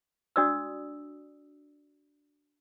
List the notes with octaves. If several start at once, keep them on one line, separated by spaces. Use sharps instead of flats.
D4 F#4 D5 D#6 E6